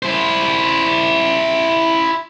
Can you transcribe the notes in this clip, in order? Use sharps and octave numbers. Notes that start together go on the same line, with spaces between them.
E4 C5